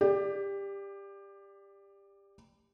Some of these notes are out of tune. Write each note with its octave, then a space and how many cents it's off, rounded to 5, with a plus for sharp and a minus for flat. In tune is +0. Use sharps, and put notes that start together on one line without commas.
G4 +20 D5 +0